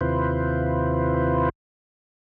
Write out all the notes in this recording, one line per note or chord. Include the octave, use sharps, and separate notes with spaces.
D#2 C3 E4 F4 B4 C5